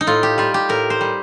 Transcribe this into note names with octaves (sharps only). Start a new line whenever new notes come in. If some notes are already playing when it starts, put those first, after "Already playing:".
D#4
A2 F4
G4
G3 F4
G4
A2 A#4
C5
G3